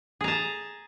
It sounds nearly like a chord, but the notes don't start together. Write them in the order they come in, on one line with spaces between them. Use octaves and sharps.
G#4 A#5 A5